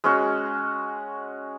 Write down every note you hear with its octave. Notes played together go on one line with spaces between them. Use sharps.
G#3 C#4 F#4